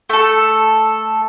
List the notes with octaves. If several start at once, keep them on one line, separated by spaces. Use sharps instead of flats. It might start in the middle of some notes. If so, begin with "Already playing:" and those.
A3 A4